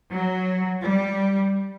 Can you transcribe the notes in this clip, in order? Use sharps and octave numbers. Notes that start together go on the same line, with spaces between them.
F#3
G3